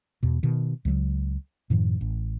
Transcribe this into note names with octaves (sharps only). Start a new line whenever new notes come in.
E2 B2
B2 D#3
C#2 C#3 F3 F#3
F#2 A2 D#3 F3
A1